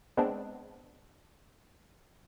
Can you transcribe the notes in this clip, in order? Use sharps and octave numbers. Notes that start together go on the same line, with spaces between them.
G#3 B3 C4 D4